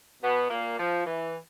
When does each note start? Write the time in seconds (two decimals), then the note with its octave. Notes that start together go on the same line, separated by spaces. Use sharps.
0.22 B2 B3
0.50 A#2 A#3
0.79 F3
1.07 E3